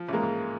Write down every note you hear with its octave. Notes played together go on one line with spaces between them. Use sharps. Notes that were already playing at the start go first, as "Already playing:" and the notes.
Already playing: F3
A1 G#3 A#3
G#2